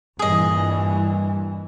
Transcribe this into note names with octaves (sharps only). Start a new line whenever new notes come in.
G2 A#2 E3 G#4 D#5